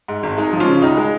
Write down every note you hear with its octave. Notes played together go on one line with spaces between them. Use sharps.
G#2
G#1
G#3 D#4
F3
C#4 F4
C#3
C#2 D#4
G#3